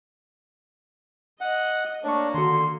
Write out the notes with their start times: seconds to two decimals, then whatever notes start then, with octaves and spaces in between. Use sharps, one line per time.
1.41 D#5 F#5
2.04 A#3 D4 C#5 C#6
2.34 D3 D#3 F#4 C6